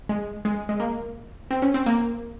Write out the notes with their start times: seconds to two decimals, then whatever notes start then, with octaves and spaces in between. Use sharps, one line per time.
0.09 G#3
0.45 G#3
0.69 G#3
0.80 A#3
1.51 C4
1.62 C#4
1.74 C4
1.86 A#3